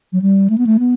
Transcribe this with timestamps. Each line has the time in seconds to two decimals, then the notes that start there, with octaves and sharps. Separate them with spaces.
0.12 F#3
0.22 G3
0.50 A3
0.58 B3
0.67 A3
0.79 B3